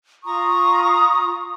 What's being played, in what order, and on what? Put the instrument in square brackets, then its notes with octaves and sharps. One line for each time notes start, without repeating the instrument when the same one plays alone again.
[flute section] F4 A#5 C#6 D#6